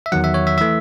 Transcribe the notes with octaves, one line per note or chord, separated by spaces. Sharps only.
E5
E2 D#3 F#3 F#5
E5
C#5
E5
E3 A3 E5